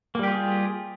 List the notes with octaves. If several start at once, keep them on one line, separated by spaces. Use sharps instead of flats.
G3 A#3 F4 G4 G#4